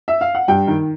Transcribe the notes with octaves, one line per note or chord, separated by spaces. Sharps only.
E5
F5
F#5
G2 G5
D#3